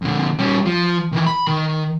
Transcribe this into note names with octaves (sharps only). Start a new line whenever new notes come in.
F2 D3
G3 C#4
F3
D#3 E3
B5
D#3